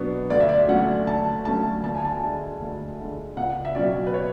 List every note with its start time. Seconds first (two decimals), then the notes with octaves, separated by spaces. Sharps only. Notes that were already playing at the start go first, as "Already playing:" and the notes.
Already playing: B2 F#3 B3 D4
0.30 D2 D5
0.40 E5
0.49 D5
0.68 D3 F#3 A3 C#4 F#5
1.07 D2 A5
1.45 D3 F#3 A3 C#4 A5
1.83 D2 A5
1.95 G#5
2.05 A5
2.22 D3 G#3
2.61 D2
2.98 D3 G#3
3.37 C#2 F#5
3.65 E5
3.75 B2 F#3 C#4 D5
4.07 B4
4.14 C#5